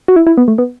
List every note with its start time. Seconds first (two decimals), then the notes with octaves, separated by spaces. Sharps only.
0.08 F#4
0.16 E4
0.27 E4
0.37 B3
0.48 A3
0.58 B3